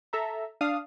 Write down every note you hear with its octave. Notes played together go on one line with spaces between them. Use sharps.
A4 E5 A#5
D4 F5 D#6